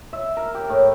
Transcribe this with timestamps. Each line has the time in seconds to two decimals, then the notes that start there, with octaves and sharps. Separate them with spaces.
0.13 E5
0.37 A#4
0.55 G4
0.69 A2